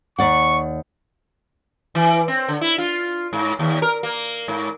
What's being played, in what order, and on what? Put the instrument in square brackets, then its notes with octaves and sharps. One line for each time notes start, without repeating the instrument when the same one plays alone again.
[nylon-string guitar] D#2 D5 F#5 [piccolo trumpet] C#6
[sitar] E3
C4
D3
E4
F4
G#2
D#2
A#4
A#3
G#2